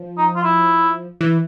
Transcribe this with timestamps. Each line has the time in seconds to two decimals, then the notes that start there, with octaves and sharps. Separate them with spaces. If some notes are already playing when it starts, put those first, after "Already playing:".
Already playing: F3
0.18 D#4
0.36 F4
0.44 E4
1.21 E3